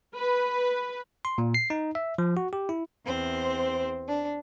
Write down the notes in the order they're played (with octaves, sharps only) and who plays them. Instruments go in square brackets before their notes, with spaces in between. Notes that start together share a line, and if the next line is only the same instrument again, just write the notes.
[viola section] B4
[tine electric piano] C6
A#2
C7
D#4
E5
F3
F#4
G4
E4
[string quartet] E2 C4 C5
D4